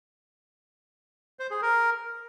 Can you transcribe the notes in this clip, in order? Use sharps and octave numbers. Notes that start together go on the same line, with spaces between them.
C5
G#4
A#4